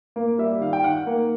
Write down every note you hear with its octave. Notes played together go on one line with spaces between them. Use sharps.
A#3
G3 E5
D#3 F5
G5
D#3 F#5
A#3